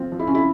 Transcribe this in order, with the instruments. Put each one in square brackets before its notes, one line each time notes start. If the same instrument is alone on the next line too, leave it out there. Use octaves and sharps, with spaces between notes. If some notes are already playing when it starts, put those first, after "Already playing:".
Already playing: [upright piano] F3 F4 [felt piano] C4
[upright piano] F3
[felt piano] E4
C#4
E4